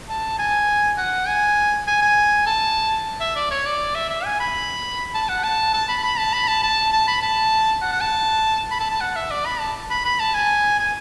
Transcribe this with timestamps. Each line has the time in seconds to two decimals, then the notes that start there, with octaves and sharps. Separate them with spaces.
0.09 A5
0.39 G#5
0.98 F#5
1.27 G#5
1.87 G#5
2.02 G#5
2.47 A5
3.20 E5
3.36 D5
3.51 C#5
3.66 D5
3.95 E5
4.10 E5
4.25 G#5
4.40 B5
5.14 A5
5.29 F#5
5.44 A5
5.74 A5
5.89 B5
6.03 B5
6.18 A5
6.33 B5
6.48 A5
6.63 A5
6.93 A5
7.08 B5
7.22 A5
7.82 F#5
7.92 F#5
8.01 A5
8.71 B5
8.80 A5
8.91 A5
9.01 F#5
9.16 E5
9.31 D5
9.46 B5
9.60 A5
9.90 B5
10.05 B5
10.20 A5
10.35 G#5
10.79 G#5